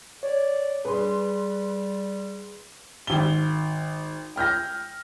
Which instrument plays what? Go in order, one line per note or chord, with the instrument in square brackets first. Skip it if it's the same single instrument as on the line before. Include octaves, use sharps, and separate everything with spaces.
[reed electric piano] C#5 [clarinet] D5
[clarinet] G3 [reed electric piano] G#4 [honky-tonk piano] B4 C6
[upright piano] G#1 G7
G5 F6 G6 A#6